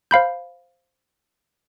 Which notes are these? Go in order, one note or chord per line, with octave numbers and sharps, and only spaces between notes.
C5 F5 B5 G6